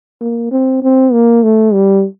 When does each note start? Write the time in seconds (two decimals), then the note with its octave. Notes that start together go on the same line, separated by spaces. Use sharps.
0.21 A#3
0.51 C4
0.83 C4
1.13 A#3
1.43 A3
1.73 G3